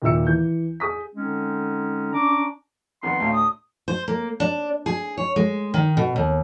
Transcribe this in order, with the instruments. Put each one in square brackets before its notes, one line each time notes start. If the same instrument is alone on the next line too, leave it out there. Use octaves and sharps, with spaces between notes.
[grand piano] D#2 A#2 D#3 E5 E6 C#7
E3 G6
G#4 D#6 B6
[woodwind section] D3 G#3 C4 C#4 D#4
C#4 D4 A#5 D6
[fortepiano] F2 D#3 B3 [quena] F#5 [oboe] C6
[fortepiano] D2 A2 [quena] F5
[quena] D#6
[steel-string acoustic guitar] C5
A#3
D4
G#4
C#5
G#3
D#3
B2
D#2